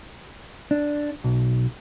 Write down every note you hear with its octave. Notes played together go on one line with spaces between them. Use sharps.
D4
B1